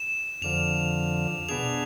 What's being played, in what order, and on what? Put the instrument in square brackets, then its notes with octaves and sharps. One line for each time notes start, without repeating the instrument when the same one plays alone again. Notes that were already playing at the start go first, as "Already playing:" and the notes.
Already playing: [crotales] E7
[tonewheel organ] F2 D3 F3 [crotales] F7
[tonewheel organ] B2 B3 D4 G#4 [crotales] F7